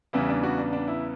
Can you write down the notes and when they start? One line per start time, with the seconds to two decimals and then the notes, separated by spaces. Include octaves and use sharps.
0.13 E2 C#3 E3 G3 B3 E4
0.29 D4
0.43 D4 F#4
0.58 D4
0.73 D4
0.88 E4